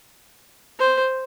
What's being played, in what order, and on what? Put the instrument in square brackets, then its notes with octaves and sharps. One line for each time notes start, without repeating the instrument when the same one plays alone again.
[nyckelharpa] C5